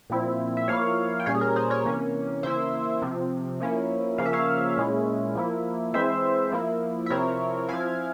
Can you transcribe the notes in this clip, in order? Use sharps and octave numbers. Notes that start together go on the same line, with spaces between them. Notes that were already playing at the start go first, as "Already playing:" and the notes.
A#2 F3 C4 E4
E5
F3 A#3 E4 C#5 F5
G5
A#2 G3 C#4 C#5 F5
G#4
A#4
G#4 C5
A#4 C#5
C3 E3 A#3 C#4
C#3 E3 A#3 E4 C5 E5
C3 F3 C4
F3 A#3 C#4 E4
C#3 F3 A#3 C#4 F5
E5
C#5 F5
A#2 G#3 C#4 E4
F3 A#3 E4
E3 G#3 C4 E4 C5 E5
F3 A#3 E4
E5
C3 F3 C4 E4 A#4 C#5
F3 C4 E4 F5 G#5